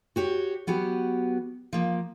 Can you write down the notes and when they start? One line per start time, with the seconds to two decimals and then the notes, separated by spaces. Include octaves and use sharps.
0.16 F#4 G4 C#5
0.67 F#3 B3 F#4 G4
1.73 F3 A#3